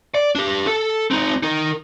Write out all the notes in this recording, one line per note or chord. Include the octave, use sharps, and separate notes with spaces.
D5
D4 G4
A4
C4 D#4
D#4 A#4